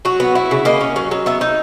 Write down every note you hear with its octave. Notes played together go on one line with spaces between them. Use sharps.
F#3 F#4
B3
E4
C#3
A#3 D#5
C#4
F#3
F#3
B3 E5
D#4